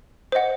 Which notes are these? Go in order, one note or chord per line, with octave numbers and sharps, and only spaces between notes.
C5 D#5 F#5